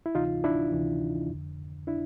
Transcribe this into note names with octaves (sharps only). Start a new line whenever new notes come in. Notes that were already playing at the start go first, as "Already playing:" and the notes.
E4
D2 C3 E3 D#4 F4
D4 E4
D2 C3 E3
F2 D3
D4 E4